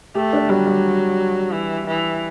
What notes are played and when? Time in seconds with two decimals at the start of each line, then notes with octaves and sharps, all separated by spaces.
0.15 A3 G4
0.33 D4
0.50 F#3 G3
0.66 G3
1.53 E3
1.87 E3